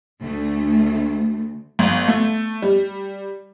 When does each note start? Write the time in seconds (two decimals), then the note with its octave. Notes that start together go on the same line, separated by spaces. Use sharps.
0.22 D2 A3
1.79 G1
2.08 A3
2.62 G3